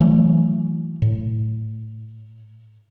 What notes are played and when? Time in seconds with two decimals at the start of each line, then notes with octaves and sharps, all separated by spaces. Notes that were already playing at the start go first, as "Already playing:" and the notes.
0.01 E3 F#3 A3
1.02 A2